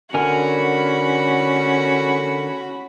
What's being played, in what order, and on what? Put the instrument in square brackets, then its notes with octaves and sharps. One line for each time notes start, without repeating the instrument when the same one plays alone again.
[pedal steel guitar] D3 A#4 G#5 [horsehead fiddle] C#4 B5 [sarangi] F#4